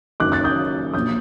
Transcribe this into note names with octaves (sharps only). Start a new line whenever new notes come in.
F#1 F#2 D#3 D6 F#6
F#6 A6
D#6 G6
A#1 A#2 D#6 G6